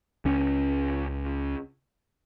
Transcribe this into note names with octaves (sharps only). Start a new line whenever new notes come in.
C#2 C#4